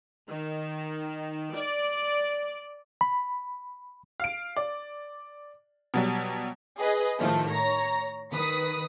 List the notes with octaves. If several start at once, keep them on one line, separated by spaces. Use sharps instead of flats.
D#3
D5
B5
F5 D7
D5
B2 F#3 G3
G#4 B4 D#5
A2 D#3 F3 A3
C#5 A#5
D#3 B4 D#6 B6